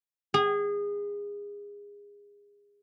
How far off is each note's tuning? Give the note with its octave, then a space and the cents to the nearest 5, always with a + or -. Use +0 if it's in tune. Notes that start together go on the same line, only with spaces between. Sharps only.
G#4 -25